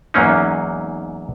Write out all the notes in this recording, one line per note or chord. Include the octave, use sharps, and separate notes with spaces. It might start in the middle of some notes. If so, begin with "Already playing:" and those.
E2 G#2 F#3 A#3 C#4 D#4